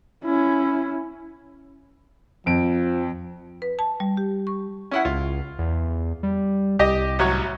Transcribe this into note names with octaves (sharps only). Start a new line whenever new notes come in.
C#4 E4
F2 F3 D7
B4
A5
G3
G4
C#6
C#4 E4 F#5
C#2 F4
E2
G3
C2 G4 D#5
A1 F#3 C#5